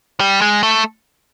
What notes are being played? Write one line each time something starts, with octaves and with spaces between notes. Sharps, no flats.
G3
G#3
A3